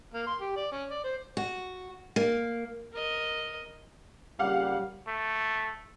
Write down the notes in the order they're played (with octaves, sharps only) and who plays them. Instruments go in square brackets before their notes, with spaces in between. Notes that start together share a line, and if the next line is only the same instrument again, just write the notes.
[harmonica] A#3
C6
G4
D5
C#4
D5
C5
[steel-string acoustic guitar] F#4
A#3
[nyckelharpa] A#4 D#5
[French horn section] A#2 C#3 G3 [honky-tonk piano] G4 F5 F#5
[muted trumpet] A3